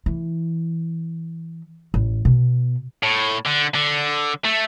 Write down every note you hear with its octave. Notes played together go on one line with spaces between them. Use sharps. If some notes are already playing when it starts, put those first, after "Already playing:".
E3
A1
B2
A2
D3
D3
A3